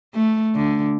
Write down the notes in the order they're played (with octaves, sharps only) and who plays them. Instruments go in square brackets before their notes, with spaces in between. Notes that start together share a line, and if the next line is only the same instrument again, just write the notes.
[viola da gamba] A3
D3